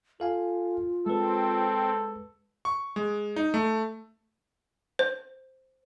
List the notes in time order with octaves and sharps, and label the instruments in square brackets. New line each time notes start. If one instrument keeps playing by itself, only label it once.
[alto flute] F4 [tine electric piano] A4 F5 G#5
[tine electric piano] G#3 B4 [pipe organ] C4 [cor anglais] A4
[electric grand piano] C#6
G#3
D#4
A3
[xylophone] C5